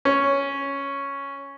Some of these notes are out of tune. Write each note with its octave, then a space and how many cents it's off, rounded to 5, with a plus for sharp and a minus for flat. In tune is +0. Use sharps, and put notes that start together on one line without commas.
C#4 +0